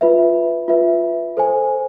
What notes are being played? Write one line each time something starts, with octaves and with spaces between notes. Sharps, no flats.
F4 B4 E5
F4 B4 E5
A4 C5 G#5